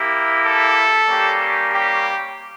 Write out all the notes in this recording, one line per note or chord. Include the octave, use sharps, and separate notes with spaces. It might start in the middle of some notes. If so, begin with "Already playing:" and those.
Already playing: A#3 E4 G4
A4
G3 A#3 C#4 G4
G4